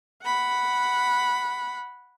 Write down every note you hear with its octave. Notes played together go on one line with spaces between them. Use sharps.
F#5 B5